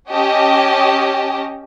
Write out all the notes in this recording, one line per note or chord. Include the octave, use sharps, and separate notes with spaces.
C#4 G4 D#5 A5